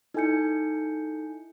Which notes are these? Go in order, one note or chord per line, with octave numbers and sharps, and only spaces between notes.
D#4 E4 A4 G#5 G6 C#7